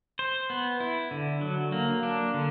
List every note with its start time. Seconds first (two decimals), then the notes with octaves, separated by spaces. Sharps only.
0.19 C5
0.50 B3
0.80 E4
1.11 D3
1.41 F#3
1.72 A#3
2.03 D4
2.34 D3